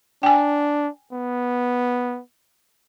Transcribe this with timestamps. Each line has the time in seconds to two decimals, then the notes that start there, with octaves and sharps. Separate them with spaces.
0.23 D4 G5 G#5
1.13 B3